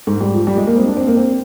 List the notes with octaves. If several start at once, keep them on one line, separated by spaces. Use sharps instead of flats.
G#2
G3
F3
G3
G#3
A#3
C4
D4
C4
A#3
C4